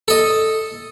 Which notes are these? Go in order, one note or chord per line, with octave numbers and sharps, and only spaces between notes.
A4 D#5